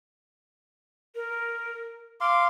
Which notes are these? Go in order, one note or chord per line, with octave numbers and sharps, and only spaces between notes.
A#4
F5 C6 D6